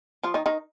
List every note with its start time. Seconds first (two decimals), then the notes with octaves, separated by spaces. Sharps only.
0.23 F3 F4
0.34 D#3 D#4
0.46 D#3 D#4